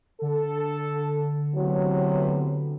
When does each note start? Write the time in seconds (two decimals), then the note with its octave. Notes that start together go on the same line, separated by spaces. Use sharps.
0.22 D3 A4
1.55 A2 C3 F#3 B3